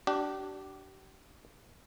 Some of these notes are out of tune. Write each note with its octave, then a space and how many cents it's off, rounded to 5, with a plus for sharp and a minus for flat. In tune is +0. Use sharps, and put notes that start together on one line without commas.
D4 +0 G4 -40